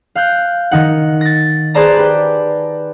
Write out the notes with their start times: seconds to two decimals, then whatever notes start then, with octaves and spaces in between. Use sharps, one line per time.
0.15 F5 F#6 G6
0.71 D#3 D#4 F#5
1.21 A6 A#6
1.74 G#4 B4 C5 D5 A5 A#5
1.96 G4 B4